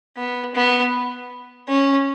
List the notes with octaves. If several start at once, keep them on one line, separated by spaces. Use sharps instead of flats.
B3
B3
C#4